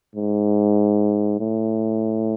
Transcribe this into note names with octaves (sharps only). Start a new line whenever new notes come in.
G#2
A2